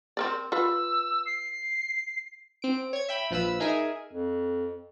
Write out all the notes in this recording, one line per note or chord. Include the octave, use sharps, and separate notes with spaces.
C4 A#4 D5
F4 B4 E6
C7
C4 D7
C#5 G#6
E5 G5 B5
A#1 F3 B4 B5 E6
D#4 G#4 A#4 E5 G#5
F2